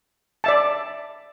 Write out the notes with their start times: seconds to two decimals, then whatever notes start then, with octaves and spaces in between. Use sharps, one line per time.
0.44 D5 E5 A5